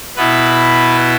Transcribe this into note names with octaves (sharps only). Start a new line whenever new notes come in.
B2 B3 E4 B4